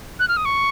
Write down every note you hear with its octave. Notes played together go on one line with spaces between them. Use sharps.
F#6
F6
D#6
C#6